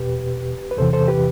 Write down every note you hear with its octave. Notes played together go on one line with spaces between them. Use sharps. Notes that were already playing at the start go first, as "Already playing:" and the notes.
Already playing: E2 B2 G4 B4
B4
E2 C3 E3 A4 C5
A4 C5
G4 B4